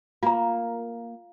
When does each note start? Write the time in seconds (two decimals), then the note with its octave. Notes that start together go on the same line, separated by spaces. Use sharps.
0.23 A#3 F4 A#5